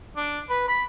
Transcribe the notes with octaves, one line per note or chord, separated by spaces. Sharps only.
D4
B4
B5